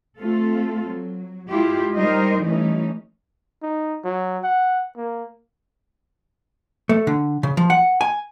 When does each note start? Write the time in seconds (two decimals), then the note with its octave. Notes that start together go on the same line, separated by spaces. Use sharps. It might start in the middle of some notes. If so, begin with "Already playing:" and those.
0.19 A3 C4 F4 A4
0.87 F#3
1.49 G#3 E4 F4 G4
1.98 G3 D#4 A#4 C5 D#5
2.43 E3 G3 A3 C#4 D#4
3.62 D#4
4.04 F#3
4.44 F#5
4.96 A#3
6.89 A3
7.07 D3
7.43 C#3
7.57 F3
7.70 F#5
8.01 G#5